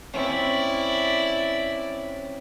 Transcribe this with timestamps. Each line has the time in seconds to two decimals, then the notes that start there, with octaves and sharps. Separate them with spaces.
0.14 C4 C#4 E4 D5